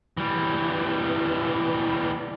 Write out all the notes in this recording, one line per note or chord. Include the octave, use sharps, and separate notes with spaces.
E3 G3